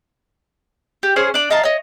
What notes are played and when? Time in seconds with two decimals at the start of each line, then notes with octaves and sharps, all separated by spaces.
1.03 G4
1.16 C#4 G#4 C5
1.34 D4 D5
1.50 D#5 F5 A5 A#5
1.63 C#5 D#5